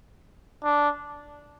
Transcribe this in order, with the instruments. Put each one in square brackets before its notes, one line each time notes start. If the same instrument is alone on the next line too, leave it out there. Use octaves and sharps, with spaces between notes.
[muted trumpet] D4